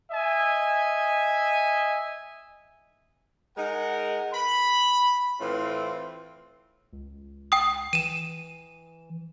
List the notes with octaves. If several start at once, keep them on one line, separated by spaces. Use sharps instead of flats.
D#5 E5 G#5
G#3 D#4 A#4 F#5
B5
A2 E3 C4 F4
C#2
G5 D#6
E3 D#7 E7